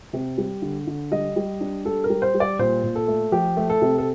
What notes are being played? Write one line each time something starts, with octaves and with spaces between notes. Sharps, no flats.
C3
G3
D3
D3
G3 D#5
G3
D4
G3 A4
A#4
G3
C5
G3
D5
A#2 C5
A#2
A4
A3
F3 G4
A3
A4
C3
A4